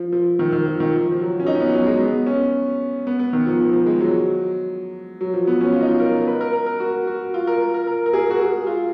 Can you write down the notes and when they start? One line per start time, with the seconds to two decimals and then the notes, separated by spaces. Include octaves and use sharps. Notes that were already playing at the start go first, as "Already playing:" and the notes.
Already playing: F3
0.13 F3
0.39 D#3
0.52 D#3
0.66 F3
0.80 D#3
0.94 F3
1.12 F3
1.20 F#3
1.40 C#4
1.47 D#4
1.55 C#4
1.60 B3
1.74 F#3
1.87 G#3
1.99 B3
2.27 C#4
3.07 B3
3.19 B3
3.33 D#3
3.46 F3
3.60 F3
3.73 F3
3.86 G#3
4.01 F#3
5.21 F#3
5.34 F3
5.47 B3
5.61 C#4
5.74 F4
5.81 D#4
5.88 F4
6.00 A#4
6.27 B4
6.41 A#4
6.53 A#4
6.66 A#4
6.80 F#4
7.07 F#4
7.34 F4
7.47 A#4
7.60 A#4
7.74 A#4
7.87 A#4
8.06 A#4
8.13 G#4
8.30 F#4
8.40 G#4
8.67 F4